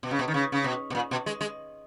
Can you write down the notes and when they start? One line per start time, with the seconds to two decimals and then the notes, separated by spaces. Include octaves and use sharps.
0.03 B2
0.11 C#3
0.19 B2
0.28 D#3
0.34 C#3
0.52 C#3
0.64 B2
0.90 B2
0.95 A#2
1.11 B2
1.26 G#3
1.41 G#3